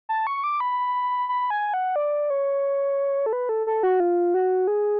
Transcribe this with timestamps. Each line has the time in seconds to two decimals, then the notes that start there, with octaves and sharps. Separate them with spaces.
0.09 A5
0.27 C#6
0.44 D6
0.60 B5
1.29 B5
1.50 G#5
1.74 F#5
1.96 D5
2.30 C#5
3.26 A4
3.33 B4
3.49 A4
3.67 A4
3.83 F#4
4.00 F4
4.34 F#4
4.67 G#4